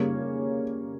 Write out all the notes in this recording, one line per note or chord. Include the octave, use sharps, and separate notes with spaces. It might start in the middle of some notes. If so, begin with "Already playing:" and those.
Already playing: C#3 G3 A#3 C#4 C#5